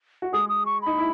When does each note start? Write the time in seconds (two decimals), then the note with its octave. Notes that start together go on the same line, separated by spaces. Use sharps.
0.22 F#4
0.33 G#3 G#4 D#6
0.49 D#6
0.66 C#6
0.82 D#4 B5
0.98 E4